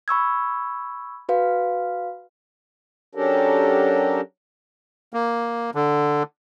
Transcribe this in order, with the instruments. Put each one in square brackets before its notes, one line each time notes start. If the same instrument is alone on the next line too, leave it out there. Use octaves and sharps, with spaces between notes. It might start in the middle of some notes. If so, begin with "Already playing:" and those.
[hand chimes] B5 C#6 E6 G#6
F#4 B4 F5
[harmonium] F#3 C#4 D4 G4 A4 A#4
[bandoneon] A#3
D3